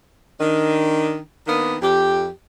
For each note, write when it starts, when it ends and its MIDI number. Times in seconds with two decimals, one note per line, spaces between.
0.40 1.20 51
0.40 1.20 62
1.47 1.76 51
1.47 1.76 58
1.47 1.76 59
1.47 1.76 62
1.81 2.29 41
1.81 2.29 67